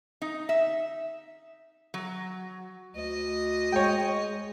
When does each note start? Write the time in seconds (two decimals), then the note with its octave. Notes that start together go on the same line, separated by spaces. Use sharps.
0.22 D#4
0.49 E5
1.94 F#3
2.96 D2 D#5
3.72 G#3 C#5 G5